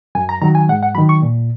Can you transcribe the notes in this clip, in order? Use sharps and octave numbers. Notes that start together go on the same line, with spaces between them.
F#2 G#5
A#5
D#3 F#3 A#5
G#5
G#2 F#5
F#5
D#3 F#3 B5
C#6
A#2